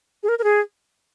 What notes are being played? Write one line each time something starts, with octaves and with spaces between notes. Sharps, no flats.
G#4
A#4
A#4
G#4